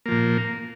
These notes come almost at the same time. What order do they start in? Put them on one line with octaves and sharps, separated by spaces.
A#3 F3 A#2